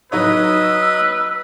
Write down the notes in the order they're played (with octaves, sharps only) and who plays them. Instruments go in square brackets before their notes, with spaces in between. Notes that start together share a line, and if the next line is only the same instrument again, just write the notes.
[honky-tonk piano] F#3 D#4 C#5 [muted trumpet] B4 [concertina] D#5 D#6 [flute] E6